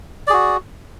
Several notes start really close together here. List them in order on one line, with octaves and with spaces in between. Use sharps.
D5 G#4 F#4